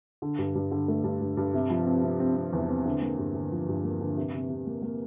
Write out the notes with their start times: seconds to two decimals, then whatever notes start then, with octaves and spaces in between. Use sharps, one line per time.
0.22 D3
0.39 G2
0.55 G2
0.71 D3
0.88 A3
1.04 G2
1.21 G2
1.37 G2
1.54 C3
1.70 F3
1.87 C4
2.03 C3
2.20 C4
2.36 C4
2.53 E2
2.69 C4
2.85 D3
3.02 A#3
3.18 G2
3.34 D3
3.52 F3
3.68 G2
3.84 A#3
4.01 D3
4.17 C3
4.34 C3
4.49 C3
4.67 A#3
4.82 A#3